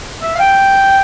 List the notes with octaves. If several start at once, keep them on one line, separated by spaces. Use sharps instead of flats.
E5
F5
G5